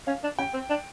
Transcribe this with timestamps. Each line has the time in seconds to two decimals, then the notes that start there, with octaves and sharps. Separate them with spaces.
0.07 C#4 F5
0.23 D4
0.38 C#4 G5
0.54 C4
0.70 D4